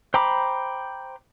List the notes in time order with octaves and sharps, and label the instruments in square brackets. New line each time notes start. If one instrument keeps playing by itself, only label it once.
[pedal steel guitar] C5 G5 A#5 B5 D6